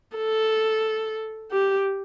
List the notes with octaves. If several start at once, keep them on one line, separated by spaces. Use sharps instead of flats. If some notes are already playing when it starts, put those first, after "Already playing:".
A4
G4